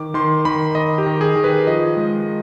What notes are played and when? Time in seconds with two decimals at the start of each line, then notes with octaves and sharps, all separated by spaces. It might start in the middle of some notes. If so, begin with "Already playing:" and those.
Already playing: D#3 D6
0.14 D#3 C6
0.45 D#3 B5
0.75 D#3 D#5
0.98 G4
1.06 D#3
1.21 G#4
1.36 D#3
1.44 B4
1.67 F3 D#5
1.97 G#3